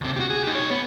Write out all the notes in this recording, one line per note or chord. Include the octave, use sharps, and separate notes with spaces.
D2 C3
F#4 G4
G#4
D#4 G4
B1 C#5
B3